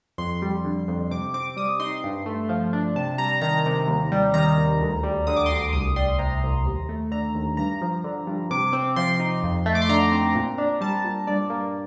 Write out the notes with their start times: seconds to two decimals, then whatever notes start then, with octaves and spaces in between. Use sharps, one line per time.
0.18 F2 C6
0.42 G3
0.65 D3
0.88 F2
1.11 C3 D6
1.34 C4 D6
1.57 G3 D#6
1.80 D#4 C6
2.04 G2
2.26 A3
2.49 F3
2.73 D4
2.96 C3 A5
3.18 G3 A#5
3.41 D#3 A#5
3.66 C3
3.88 D#2
4.12 G3
4.34 D#3 A#5
4.58 D#2
4.80 D2
5.03 G3
5.27 D3 D#6
5.37 D6
5.46 D2 C6
5.56 D6
5.73 C2 D#6
5.96 G3 C6
6.19 C3 A#5
6.43 C2
6.66 D#2
6.89 A3
7.11 D3 A#5
7.35 D#2
7.57 G2 A#5
7.82 F3
8.04 D3
8.27 G2
8.51 C3 D6
8.73 C4
8.96 F3 C6
9.20 D#4
9.43 F2
9.66 A3
9.75 D6
9.82 C6
9.89 D3 A#5
10.12 C4
10.35 A#2
10.58 D4
10.81 G3 A5
11.04 A#2
11.27 G2 D5
11.50 A#3